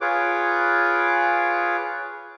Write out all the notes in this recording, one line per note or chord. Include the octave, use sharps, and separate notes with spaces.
F4 G#4 B4 C#5 D6